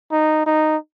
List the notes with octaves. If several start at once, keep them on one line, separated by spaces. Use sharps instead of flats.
D#4
D#4